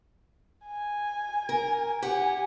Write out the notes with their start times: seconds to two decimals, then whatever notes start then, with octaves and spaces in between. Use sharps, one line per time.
0.66 G#5
1.49 A#4
2.02 G4 F#5 G#5